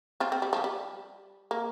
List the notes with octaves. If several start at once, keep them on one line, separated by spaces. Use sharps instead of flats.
C4 F4
C4
G3
F3
G3
A#3